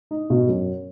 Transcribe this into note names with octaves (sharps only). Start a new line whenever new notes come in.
D#4
B2
F#2